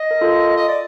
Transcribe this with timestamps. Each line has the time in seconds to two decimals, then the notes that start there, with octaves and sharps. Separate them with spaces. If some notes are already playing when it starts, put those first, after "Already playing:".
Already playing: D#5
0.11 A#4
0.21 F4 A4
0.57 D#5
0.68 D5